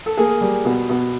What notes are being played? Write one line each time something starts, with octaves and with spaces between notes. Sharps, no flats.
A4
A#3 G#4
G3
B2
B2